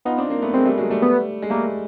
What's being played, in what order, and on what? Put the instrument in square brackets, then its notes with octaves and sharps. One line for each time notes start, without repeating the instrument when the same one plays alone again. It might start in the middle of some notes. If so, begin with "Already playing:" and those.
[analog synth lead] B3 [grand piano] D#4 F4
[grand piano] C4 D4
A#3 C4
A3 B3
[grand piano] G#3 A#3 [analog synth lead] C4
[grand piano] G3 A3
F#3 G#3
G3 A3
[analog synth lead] B3
[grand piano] G#3
[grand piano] G3 A3 [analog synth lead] A#3